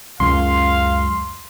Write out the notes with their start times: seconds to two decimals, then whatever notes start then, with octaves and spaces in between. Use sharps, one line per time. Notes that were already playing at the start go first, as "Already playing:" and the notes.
0.20 C#2 F#2 C#3 F5 C6